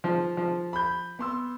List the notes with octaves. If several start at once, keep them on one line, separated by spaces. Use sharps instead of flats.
F3
F3
B5 G6
B3 C6 E6